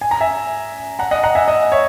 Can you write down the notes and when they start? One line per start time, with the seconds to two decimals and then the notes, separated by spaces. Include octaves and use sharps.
0.01 G#5
0.11 A#5
0.21 E5 G#5
0.99 F#5 A#5
1.11 D#5 F#5
1.24 F#5 A#5
1.35 E5 G#5
1.48 D#5 F#5
1.72 C#5 E5